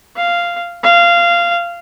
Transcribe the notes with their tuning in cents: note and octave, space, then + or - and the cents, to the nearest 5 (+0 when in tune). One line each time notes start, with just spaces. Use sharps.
F5 -10
F5 -15